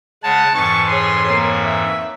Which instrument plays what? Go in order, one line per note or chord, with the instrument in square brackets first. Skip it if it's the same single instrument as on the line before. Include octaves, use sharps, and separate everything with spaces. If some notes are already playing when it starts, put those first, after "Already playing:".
[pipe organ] C#3 G#3 C#5 [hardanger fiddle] F#5 [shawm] A5
[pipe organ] F2 G#2 E3 [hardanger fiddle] A5 [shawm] C#6
[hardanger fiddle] G#4 C#5 [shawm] C6
[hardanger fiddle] A#3 C#5
[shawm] E5